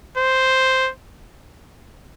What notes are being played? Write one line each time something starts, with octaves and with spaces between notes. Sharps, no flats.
C5